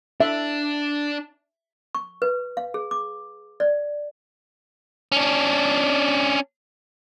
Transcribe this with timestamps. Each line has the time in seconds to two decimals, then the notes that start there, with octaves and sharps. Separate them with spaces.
0.20 D4 E5
1.95 C#6
2.22 B4
2.57 F5
2.74 G#4
2.91 D6
3.60 D5
5.12 C#4 D4